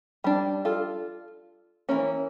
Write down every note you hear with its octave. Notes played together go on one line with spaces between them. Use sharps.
G3 D4
F4 A4
E3 A#3 C#4